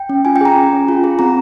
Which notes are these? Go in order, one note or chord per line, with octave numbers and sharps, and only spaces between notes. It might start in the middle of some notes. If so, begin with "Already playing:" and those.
Already playing: G5
C#4
F4 G#5
G5
G#4 A#5
C#4
C#4
F4
G#4
C4 A#5